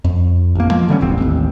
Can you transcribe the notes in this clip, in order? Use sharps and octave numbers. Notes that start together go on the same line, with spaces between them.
F2
A1 A#3
F3 G#3 A#3
D3 G3 A#3 C#4
E1 A1 C4
A1 D#2